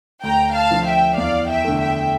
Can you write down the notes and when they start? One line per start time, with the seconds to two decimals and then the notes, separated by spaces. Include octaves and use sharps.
0.23 D2 G5 A#5
0.54 F5 A5
0.71 D3 F3
0.86 E5 G5
1.17 E2 D5 F5
1.49 E5 G5
1.65 D3 A3
1.80 E5 G5